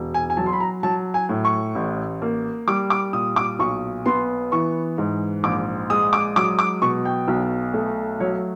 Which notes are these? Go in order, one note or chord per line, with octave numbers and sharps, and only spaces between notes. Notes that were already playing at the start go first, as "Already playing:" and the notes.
Already playing: E1
G#5
G#5
F#3 A5
C6
B5
A#5
F#3 A5
G#5
A2
C#6
A1
A#3
G3 D6
D6
A#2 D#6
D6
B1 C#6
B3 C6
E3 C#6
G#2
A#1 D6
G#3 D#6
D6
F#3 D6
D6
B2 C#6
G5
B1
A3
F#3 C#5